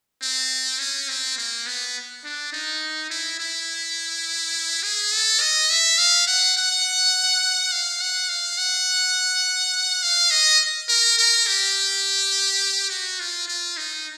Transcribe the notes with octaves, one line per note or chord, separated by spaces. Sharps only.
C4
C#4
C4
A#3
B3
D4
D#4
E4
E4
G#4
A4
D#5
E5
F5
F#5
F#5
F5
F#5
F5
F#5
F5
D#5
A#4
A#4
G4
F#4
F4
F4
D#4